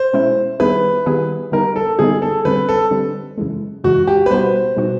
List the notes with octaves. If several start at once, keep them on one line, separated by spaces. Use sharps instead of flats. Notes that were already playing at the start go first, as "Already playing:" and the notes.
Already playing: C5
B2 G#3 C#4 E4
D#3 G3 B3 E4 G#4 B4
D#3 G3 B3 E4 G#4
D3 G3 B3 D#4 A#4
A4
D3 G3 B3 D#4 G#4
A4
D3 G3 C4 B4
A4
D3 G3 C4
F#2 C#3 E3 G#3
F#2 C#3 E3 G#3 F#4
G4
B4
B2 G3 B3 D#4 F#4 C5
B2 G3 B3 D#4 F#4